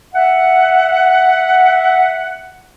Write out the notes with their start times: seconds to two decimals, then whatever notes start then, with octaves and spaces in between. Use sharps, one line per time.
0.14 E5 F#5